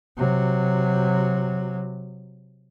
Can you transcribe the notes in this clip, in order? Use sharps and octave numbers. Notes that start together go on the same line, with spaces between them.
C3 F#3